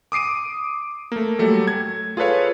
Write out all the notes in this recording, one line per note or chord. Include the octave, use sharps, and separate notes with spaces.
D6 D#6 C7 D7 D#7
A3 A#3
F#3 G3 A3 A4
G#6
F4 G#4 A4 B4 C#5 F5